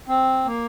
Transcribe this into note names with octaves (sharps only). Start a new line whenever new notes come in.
C4
A#3